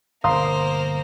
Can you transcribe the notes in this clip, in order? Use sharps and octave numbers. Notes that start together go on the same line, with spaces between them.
G1 B2 A#3 C5 F5 A#5 C6 D#6